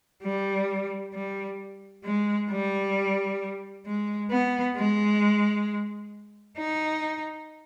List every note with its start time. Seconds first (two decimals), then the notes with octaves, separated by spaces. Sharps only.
0.23 G3
1.13 G3
2.04 G#3
2.50 G3
3.86 G#3
4.30 B3
4.77 G#3
6.57 D#4